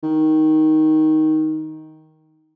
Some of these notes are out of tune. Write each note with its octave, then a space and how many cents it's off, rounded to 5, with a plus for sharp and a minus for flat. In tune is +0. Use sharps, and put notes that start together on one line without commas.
D#3 +5